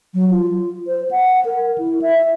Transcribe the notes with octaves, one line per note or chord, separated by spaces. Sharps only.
F#3
F4
C5
F#5
A#4
E4
E5